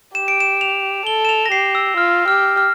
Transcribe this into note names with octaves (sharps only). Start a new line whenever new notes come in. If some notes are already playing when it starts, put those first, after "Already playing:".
G4 E7
D7
E7
F7
A4 G7
E7
F7
A#6
G4 C7
E6
F4 F6
G4 F6
F6